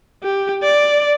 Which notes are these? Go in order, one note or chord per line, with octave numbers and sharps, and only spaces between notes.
G4
D5